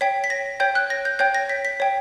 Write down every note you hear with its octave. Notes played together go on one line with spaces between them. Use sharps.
C#5 G5 B6
B6
A#6
C#5 G5 G6
F#6
A#6
G6
C#5 G5 G6
A#6
B6
B6
C#5 G5